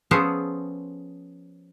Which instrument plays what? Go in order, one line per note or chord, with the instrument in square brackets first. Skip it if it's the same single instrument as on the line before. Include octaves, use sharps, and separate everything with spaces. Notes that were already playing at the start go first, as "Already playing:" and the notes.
[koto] F3 B3 C#4 G#4 A4 C5